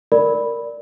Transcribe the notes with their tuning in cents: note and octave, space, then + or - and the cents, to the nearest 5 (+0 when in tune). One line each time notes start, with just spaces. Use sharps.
A#4 +0 D5 +0 B5 +0